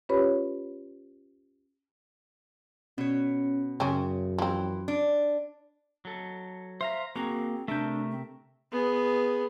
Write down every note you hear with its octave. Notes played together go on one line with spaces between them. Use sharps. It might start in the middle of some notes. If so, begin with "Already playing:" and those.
C#4 F4 G4 B4 C#5 B5
B2 C#4 C#5
F#2 C#3 C4 C#4
E3 F3 C4
D4
F#3 A4
C5 E5 F5 A#5
A#3 C4 F#4 G#4 A#5
C3 A3 D4 A#4 E5 G6
C4
B3 G#4